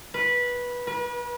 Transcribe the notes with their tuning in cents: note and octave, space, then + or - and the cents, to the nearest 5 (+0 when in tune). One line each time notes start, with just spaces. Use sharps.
B4 -15
B4 -40